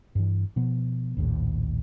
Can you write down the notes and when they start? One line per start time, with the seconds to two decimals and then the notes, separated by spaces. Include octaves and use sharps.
0.15 G2 E3
0.56 B2 F3 B3
1.17 A#1 D#2 A2